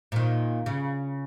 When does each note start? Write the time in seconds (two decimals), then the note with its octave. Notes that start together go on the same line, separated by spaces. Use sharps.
0.12 A#2 D#3
0.66 C#3